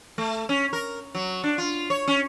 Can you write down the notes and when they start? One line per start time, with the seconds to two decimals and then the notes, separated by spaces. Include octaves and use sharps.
0.18 A3
0.49 C#4
0.73 A#4
1.15 F#3
1.44 D4
1.58 F4
1.90 C#5
2.08 C#4